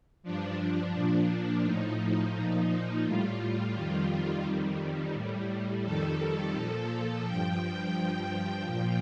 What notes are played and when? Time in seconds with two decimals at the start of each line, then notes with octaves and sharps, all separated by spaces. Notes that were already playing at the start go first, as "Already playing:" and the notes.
0.23 G2 F3 D4
0.94 A#2 F3
1.63 A2 F3 D#4
2.34 A#2 F3
3.04 A2 G3 F4
3.74 F2 D#3 G3
4.44 F2 D#3 G3
5.14 A2 G3
5.84 F2 D#3 G3 A4
6.54 A#2 F3
7.24 G2 F3 G5
7.94 G2 F3
8.64 A#2 F3 G5